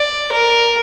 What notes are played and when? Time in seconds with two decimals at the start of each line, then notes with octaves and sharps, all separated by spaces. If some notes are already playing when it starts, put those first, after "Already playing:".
Already playing: D5
0.32 A#4